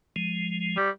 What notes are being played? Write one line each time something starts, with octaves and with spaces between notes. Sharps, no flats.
F3 G#3
G3